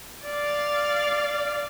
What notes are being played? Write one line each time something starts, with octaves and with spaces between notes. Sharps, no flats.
D5 F5